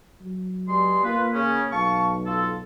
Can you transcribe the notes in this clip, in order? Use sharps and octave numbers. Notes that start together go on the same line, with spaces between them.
F#3
G2 G#3 C6
A#3 F4 B4
C#3 C#4
B1 F5 A5 C#6
F4 A4